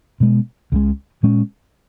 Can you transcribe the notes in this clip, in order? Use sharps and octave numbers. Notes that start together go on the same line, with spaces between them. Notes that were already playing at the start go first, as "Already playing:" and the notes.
B2 G#3 B3
C#2 C#3 G#3
A#2 G#3 C#4